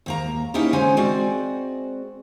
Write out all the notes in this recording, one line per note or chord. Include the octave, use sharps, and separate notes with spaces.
D#2 A#3 A#5
A#3 C#4 D#4 E4 G4
D3 G#3 C#4 C5 G#5
G#3 C4 F#4 D5